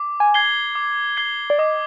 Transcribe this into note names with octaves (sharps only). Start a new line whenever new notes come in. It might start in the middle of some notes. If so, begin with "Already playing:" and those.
Already playing: D6
G#5
G#6 C7 G7
D6
G#6 C7 G7
D5
D#5 D6